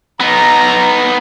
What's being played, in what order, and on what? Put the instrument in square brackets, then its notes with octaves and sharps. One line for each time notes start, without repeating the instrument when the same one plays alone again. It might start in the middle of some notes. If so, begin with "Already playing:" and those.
[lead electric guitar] B3 D#4 [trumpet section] A#5